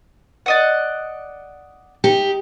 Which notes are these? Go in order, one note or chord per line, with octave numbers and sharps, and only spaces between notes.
D5 D#5 F#5
D#4 G4